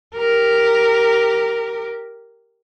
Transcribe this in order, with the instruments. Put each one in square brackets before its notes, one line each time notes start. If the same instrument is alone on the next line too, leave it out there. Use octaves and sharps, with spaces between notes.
[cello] G4 A#4